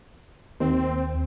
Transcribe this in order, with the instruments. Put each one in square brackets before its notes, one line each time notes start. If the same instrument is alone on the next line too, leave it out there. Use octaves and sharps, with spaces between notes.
[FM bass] D#2 [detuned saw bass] C4